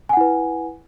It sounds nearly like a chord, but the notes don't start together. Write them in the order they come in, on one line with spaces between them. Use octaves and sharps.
G#5 F#5 E4 B4